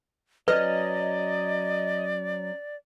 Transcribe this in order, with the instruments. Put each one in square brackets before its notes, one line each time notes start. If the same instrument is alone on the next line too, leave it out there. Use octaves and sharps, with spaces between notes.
[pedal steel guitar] F#3 C#4 [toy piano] B4 [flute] D5 [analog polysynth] D#5